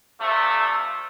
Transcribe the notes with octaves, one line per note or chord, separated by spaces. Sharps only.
C3 F3 A3 D4